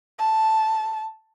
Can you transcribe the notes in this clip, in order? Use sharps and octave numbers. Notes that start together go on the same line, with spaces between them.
A5